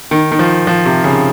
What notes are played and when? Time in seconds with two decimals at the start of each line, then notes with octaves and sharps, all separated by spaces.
0.11 D#3
0.32 D#3
0.39 F3
0.67 F3
0.86 C3
1.04 C#3